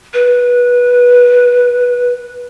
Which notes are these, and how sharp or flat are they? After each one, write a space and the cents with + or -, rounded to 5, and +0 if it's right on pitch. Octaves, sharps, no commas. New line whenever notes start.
B4 -15